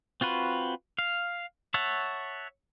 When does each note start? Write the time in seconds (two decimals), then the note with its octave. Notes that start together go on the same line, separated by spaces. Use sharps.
0.21 C4 F4 F#4 B4
0.99 F5
1.74 C#5 E5 F#5 A5